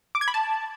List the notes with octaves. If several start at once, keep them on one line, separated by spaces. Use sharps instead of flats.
D6
G#6
B5
A5